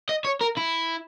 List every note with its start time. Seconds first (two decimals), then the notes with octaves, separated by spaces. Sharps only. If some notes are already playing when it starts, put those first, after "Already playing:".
0.09 D#5
0.25 C#5
0.41 A#4
0.57 E4